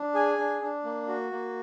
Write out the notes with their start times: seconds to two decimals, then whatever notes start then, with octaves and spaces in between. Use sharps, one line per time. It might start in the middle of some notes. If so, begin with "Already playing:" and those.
Already playing: D4
0.14 G#4 G#5
0.39 D4
0.62 D4
0.84 A#3
1.08 F#4
1.32 A#3